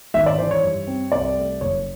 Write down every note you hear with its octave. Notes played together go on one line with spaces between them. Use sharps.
G#1 E5
D5
E3 C5
C#5
G2
C4
C2 D5
A3
F#1 C#5